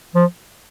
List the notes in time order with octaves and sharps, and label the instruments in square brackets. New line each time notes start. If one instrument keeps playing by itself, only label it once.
[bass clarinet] F3